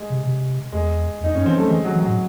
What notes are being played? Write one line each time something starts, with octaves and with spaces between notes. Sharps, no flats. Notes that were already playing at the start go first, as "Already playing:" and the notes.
Already playing: G#3
C3
C3
E2 G#3
E2
D#4
F#2 C#4
E3 C4
F#3 A3
E3 G#3
F#3
E3
F#3
A2